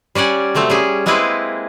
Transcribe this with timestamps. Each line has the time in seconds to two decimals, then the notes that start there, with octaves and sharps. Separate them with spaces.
0.15 G3 C#4 D5 F#5 G#5
0.55 C3 F#3 A3 C4
0.70 G3 C#4 G#4
1.06 G#3 A#3 C4 E4 G#4 B4